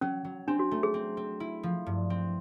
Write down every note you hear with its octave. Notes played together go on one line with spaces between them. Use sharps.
F#3 C#4
F#3
C4 D4
F#4
A3
G#4
C4
C4
E4
F3
G2
C4